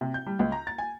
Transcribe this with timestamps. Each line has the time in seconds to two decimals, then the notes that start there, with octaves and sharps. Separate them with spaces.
0.01 C3
0.14 G6
0.26 G3
0.39 C#2
0.52 A#5
0.67 A6
0.78 G#5